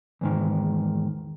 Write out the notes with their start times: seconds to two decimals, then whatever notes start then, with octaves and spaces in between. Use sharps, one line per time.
0.21 E2 G#2 D#3